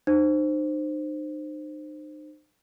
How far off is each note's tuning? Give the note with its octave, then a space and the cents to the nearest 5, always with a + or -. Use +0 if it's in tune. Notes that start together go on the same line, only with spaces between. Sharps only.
D#4 -40 C5 +0